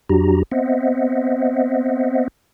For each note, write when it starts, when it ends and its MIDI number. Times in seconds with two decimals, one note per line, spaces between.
0.09 0.43 41
0.09 0.43 54
0.09 0.43 62
0.09 0.43 66
0.09 0.43 67
0.09 0.43 82
0.51 2.28 59
0.51 2.28 60
0.51 2.28 72
0.51 2.28 75
0.51 2.28 76
0.51 2.28 78